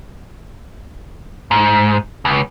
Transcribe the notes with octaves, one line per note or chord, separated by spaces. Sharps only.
G#2
C#2